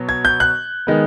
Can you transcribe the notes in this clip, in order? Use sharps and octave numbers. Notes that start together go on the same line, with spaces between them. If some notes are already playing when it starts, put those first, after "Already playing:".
Already playing: B2 F#3 B3
G#6
G6
F#6
D#3 G#3 B3